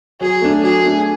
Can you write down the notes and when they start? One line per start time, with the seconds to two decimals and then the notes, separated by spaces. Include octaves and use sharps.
0.21 F#3 G#4
0.42 A3 D4
0.63 F#3 G#4
0.84 A3 D4